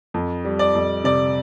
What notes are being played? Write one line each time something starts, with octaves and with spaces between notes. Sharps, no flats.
F2
G3
D5
F2
C3 D5